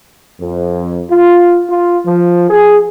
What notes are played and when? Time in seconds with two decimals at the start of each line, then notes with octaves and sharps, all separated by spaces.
0.40 F2
1.11 F4
1.70 F4
2.07 F3
2.50 G#4